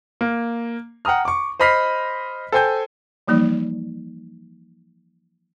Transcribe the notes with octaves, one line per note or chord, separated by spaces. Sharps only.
A#3
F#5 G5 A#5 D#6 F6
C#6 D6
C5 D#5 B5 F6 B6 C7
A4 C5 G5 G#5 G6
E3 F3 G3 A#3 D#4